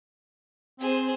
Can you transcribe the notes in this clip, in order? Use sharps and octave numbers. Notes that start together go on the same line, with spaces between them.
C4 G#4 C5